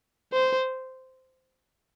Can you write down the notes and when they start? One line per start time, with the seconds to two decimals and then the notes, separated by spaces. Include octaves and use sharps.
0.33 C5